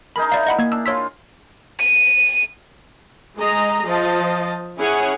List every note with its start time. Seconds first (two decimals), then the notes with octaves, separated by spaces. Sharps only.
0.16 D#4 G#4 A#4 B5
0.32 E4 D5 F5
0.47 D#5 F#5 B5
0.59 A#3 G#6
0.72 D4 E6
0.86 F4 C#5 C6 E6 B6
1.80 D#7
3.37 G#3 G#4 D#5 A#5
3.85 F3 D#5 A5
4.78 C#4 E4 G#4 C#5 F#5 G#5